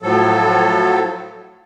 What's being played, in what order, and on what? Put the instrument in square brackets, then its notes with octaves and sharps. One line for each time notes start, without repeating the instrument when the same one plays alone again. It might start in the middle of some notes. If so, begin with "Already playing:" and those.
[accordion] A2 F3 F#3 A4